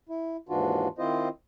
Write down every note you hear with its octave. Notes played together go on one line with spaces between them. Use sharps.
E4
D#2 G#2 E3 D4 F4 F#4
D#3 C4 E4 F4 C5 D#5